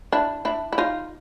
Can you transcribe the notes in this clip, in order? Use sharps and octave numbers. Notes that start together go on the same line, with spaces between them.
D4 E4
D4 E4
E4
D#4 F4